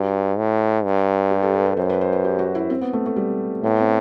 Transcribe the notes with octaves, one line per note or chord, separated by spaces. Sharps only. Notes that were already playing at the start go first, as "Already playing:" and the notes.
Already playing: G2 F#4
A2
G2
G4
A4
B4
B4
F#2 C5
B4
C5
B4
G4
F#4
E4
C4
B3
A3
A3
G3
A2 B3
C4